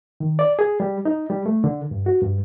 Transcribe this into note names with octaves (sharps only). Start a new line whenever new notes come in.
D#3
D5
G#4
G3
D#4
G3
A3
D3
G2
F#4
G2